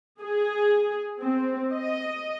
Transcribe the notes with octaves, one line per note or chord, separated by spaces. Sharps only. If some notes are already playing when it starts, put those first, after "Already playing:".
G#4
C4
D#5